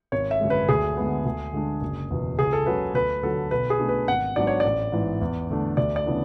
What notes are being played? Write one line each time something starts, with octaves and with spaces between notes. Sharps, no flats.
G#1 C#5
E5
F#2 D3 G#3
B4
D2 G#4
D3 G#3 B3
D2
D3 G#3 D4
F#1
E2 B2
C#2 G#4
A4
C#3 F#3 B4
D2 B4
D3 F#3 A4
B1 B4
G#4
B2 A3 D4
B4
G#1 F#5
G#2 F#3 B3 D4 D5
C#5
A1 D5
G#2 E3 B3
E2
D3 A3 D4
D2 D5
D5
C#3 E3 B3 D4